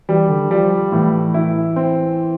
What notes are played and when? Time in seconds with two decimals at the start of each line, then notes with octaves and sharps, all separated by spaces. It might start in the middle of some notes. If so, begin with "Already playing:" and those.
0.09 E3 G3
0.29 D3
0.51 F3 G3
0.92 A2 E3
1.34 E4
1.76 C4